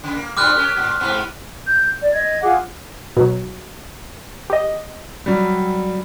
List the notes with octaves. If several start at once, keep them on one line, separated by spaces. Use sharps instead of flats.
C#3
A#3
G2 A#2 G3 D6 F6 F#6
C#4 G4 A#4
A2
G#2 C3 B3
G6
D5
D#5 G#6
F4 G#4 F#5 D6
B2 F#3
G4 D#5
F#3 G3